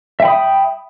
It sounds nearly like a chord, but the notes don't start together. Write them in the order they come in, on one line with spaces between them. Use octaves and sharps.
E5 G5 B5 D#6